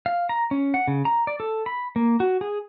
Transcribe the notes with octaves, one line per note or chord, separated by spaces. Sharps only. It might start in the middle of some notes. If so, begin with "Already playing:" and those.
F5
A#5
C#4
F#5
C#3
A#5
D5
A4
B5
A#3
F#4
G#4